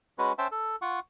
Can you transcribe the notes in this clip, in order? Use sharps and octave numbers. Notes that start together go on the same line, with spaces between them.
G#3 C#4 F#4 B4
C#4 C5 E5 G5 A5
A4
F4 F#5 C#6